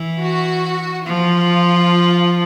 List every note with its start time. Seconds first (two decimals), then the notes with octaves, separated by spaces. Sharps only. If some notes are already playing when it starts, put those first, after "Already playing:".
Already playing: E3
0.20 F#4
1.06 F3 F4